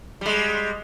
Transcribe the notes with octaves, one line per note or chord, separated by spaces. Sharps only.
G3 G#3